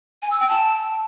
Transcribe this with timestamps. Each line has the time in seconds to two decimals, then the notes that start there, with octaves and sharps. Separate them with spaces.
0.22 G#5
0.31 E6
0.40 G5
0.49 A5